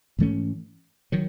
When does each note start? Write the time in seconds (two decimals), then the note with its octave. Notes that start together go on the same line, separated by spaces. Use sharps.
0.19 G#2 E3 A3 C#4
1.12 D#3 F#3